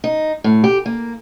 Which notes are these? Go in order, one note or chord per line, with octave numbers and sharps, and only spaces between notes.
D#4
A2
G4
A#3